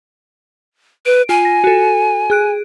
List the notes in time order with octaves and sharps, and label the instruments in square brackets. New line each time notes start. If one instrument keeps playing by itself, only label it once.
[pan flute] B4 [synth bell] D7
[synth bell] F4 [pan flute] G#5
[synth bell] A#6
F#4 A4
G#4 F#6 D7